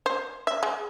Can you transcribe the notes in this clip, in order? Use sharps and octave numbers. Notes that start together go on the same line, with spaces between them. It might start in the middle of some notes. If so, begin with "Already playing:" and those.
C5
E5
G#3